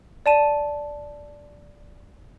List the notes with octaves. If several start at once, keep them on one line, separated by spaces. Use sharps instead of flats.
D5 A5 D#7